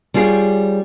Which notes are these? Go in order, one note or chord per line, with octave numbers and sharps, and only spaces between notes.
G3 C#4 F4 G4 G#4